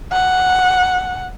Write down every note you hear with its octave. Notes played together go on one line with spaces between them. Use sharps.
F#5